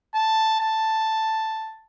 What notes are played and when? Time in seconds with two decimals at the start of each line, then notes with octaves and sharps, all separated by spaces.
0.15 A5
0.59 A5